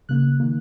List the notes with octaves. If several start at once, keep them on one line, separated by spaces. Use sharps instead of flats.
C#3 A#3 F#6
D#3 A#3